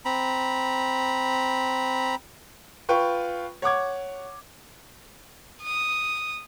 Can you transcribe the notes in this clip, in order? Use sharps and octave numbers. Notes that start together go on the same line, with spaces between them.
C4 A#5 B5
F4 B4 G5 C#6
C#5 F#5 D6 G#6
D#6